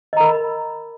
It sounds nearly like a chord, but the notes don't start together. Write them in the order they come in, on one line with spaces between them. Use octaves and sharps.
D#5 A#5 A#4 B5